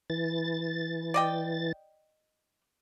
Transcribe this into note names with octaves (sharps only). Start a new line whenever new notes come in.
E3 A6
D5 D#5 G5